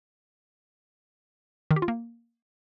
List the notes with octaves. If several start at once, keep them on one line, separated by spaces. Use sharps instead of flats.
D#3
G4
F4
A#3